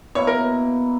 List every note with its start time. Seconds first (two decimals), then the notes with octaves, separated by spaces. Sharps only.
0.15 B2 A#3 E4 C#5
0.27 A#4